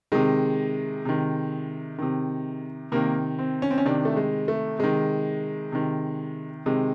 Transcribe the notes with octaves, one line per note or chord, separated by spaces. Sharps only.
C3 D#3 G#3
C3 D#3
C3 D#3
C3 D#3 A#3
C4
C#4
C4
C#4
C3 D#3 D4
A3
G#3
A3
C3 D#3 G#3
C3 D#3
C3 D#3 G#3